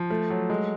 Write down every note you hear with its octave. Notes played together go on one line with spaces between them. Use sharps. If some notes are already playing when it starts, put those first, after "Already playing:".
Already playing: F3
A3
F#3
G#3